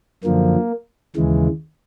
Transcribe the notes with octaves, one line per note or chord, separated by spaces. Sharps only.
F#2 D3 F3 A#3
D#2 C#3 E3 G#3